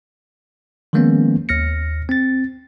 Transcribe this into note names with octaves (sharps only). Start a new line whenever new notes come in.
D#3 F3 G#3 A#3 B3 C#4
D#2 F6 A#6 C#7
C4 A6